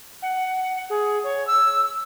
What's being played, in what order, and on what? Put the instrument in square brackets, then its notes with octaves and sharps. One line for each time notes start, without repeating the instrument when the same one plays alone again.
[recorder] F#5
G#4
C#5
E6